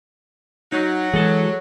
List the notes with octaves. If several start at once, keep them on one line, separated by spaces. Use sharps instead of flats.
F#3 D#4
E3 G#3 G#4 A4